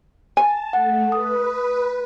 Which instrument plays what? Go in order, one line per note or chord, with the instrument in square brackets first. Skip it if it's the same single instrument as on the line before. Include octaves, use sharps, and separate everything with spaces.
[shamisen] G#5 [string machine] A5
[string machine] A3 [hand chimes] F#5
[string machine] B4 [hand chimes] D#6